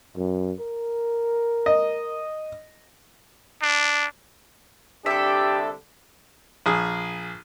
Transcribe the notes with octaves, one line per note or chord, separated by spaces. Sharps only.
F#2
A#4
D#5
D4
C2 D3 D4 G4 A4 E5
A#1 G#4